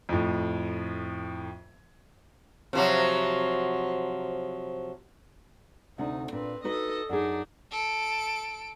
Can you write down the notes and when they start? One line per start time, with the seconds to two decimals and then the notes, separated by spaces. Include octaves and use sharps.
0.09 F2 A2
2.73 C3 F3 F#3
5.98 D2 C3 D4 D#4
6.32 A#2 C4 D4 B4
6.64 D#4 F#4 A4 B4 D#5
7.09 F#2 D4 D#4 G#4
7.71 A4 D7